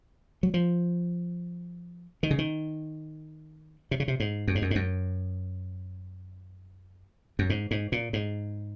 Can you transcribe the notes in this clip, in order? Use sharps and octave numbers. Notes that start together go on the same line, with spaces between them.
F#3
F3
D#3
C#3
D#3
C3
C#3
C3
G#2
F#2
G#2
F#2
G#2
F#2
F#2
G#2
G#2
A#2
G#2